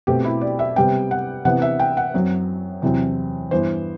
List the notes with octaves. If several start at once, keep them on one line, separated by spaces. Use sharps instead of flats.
B2 A3 C4 G4
E4
D5
E5
C3 G3 B3 G5
F#5
C3 E3 B3 F#5
E5
G5
F#5
F#2 F#3 C4
E2 C3 F#3 C4
G2 E3 B3 C5